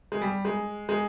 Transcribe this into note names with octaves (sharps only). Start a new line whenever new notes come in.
G#3
G3
G#3
G#3